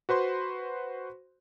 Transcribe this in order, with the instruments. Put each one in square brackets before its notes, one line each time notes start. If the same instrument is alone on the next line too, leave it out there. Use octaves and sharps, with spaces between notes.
[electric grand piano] F#4 B4 C5 C6